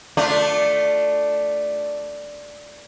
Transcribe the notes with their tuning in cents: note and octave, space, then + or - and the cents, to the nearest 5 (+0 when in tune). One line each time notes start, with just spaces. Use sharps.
A3 +0 D4 +0 F4 +0